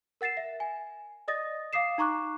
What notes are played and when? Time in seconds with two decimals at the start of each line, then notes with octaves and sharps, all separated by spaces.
0.21 A#4 F#5 A6 C7 E7
0.37 E5
0.60 G#5
1.28 D5 D#5 D#6 A6 A#6
1.73 F5 D6 D#6 C7 E7
1.98 D#4 A#5 C#6 D6 F#6